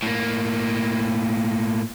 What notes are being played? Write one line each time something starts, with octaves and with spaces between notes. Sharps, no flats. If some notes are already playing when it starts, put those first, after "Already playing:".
A2 A#3